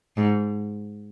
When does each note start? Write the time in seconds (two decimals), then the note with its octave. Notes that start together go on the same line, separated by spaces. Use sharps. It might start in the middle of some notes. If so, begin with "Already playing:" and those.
0.17 G#2